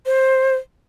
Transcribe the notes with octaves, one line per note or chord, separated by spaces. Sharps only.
C5